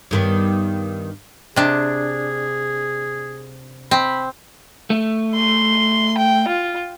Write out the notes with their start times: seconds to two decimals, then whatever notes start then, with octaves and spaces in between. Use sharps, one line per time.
0.11 G2 D#3 B3
1.56 C3 D4 G#4
3.91 C4 B5
4.90 A3
5.35 C6
6.18 G5
6.48 F4